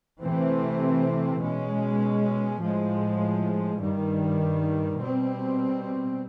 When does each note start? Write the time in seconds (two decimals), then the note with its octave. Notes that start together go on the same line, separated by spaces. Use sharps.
0.22 C3 E3 A3 C4
1.42 B2 G#3 C#4
2.61 A2 F3 G#3
3.81 G2 D#3 G3
5.00 B2 G3 C4